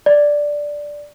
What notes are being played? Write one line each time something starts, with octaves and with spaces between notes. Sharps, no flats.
D5